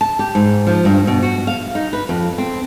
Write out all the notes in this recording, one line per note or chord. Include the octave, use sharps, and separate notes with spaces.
A5
G4
G#2
F3
G2
B2
F#4
F5
D#4
B4
F2
C4